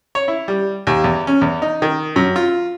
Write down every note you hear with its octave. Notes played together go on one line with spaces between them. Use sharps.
C#5
E4
G3
D#2
E2
C#4
E2
D#4
D#3
F#2
F4